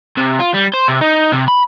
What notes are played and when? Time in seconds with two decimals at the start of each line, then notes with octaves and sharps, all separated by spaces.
0.17 C3
0.40 F4
0.54 G3
0.74 C5
0.88 C3
1.01 D#4
1.32 C3
1.48 B5